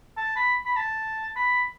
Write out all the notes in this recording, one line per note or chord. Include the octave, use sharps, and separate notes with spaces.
A5
B5
B5
A5
B5